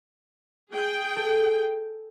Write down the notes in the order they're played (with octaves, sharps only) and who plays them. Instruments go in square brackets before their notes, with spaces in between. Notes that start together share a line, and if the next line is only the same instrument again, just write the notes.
[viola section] G#4 G5
[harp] A4